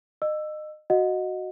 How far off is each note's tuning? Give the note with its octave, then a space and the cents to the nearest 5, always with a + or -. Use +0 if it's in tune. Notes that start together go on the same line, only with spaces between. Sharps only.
D#5 -25 E6 +10
F#4 +0 D#5 +0 F#5 -25